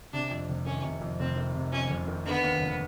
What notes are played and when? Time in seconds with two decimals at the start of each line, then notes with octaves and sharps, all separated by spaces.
0.13 C3 D4
0.31 F2
0.48 F1
0.66 D#3 C#4
0.83 C3
1.01 F2
1.19 F1 C4
1.36 D#3
1.55 C3
1.72 F2 C#4
1.90 F1
2.07 D#3
2.25 D3 B3
2.43 D#2
2.60 F1